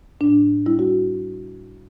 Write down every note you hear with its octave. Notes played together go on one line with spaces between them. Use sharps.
A2 D4
G3 E4
F#4